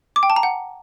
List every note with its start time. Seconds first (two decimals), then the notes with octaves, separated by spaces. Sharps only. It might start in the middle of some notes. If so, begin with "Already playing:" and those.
0.16 D6
0.23 G5
0.30 A5
0.36 A#5
0.43 F#5